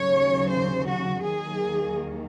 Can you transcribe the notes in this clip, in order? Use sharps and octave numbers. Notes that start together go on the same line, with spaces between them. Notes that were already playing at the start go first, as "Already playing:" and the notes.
Already playing: D#2 C#3 F#3 C#5
C5
F#4
D#2 D#3 F#3 A#3 G#4